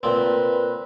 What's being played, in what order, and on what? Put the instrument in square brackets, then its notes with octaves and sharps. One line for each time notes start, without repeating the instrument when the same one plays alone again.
[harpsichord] A#2 C4 [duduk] B4